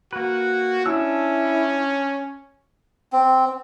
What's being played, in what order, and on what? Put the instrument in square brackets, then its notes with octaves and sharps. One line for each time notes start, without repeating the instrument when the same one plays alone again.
[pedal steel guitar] A#3 B4 [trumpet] F#4
[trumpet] C#4 [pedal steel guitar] D4 A5 E6 [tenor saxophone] E4
[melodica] C4